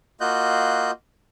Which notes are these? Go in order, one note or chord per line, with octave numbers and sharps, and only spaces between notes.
A#3 F4 F#4 D#5 F#6 G6